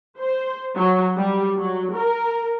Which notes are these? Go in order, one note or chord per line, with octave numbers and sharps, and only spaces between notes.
C5
F#3
G3
F#3
A#4